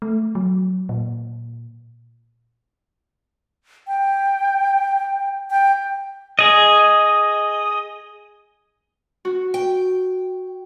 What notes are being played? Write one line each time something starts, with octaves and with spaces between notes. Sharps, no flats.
A3
F#3
A#2
G5
G5
G#4 D#5
F#4
G5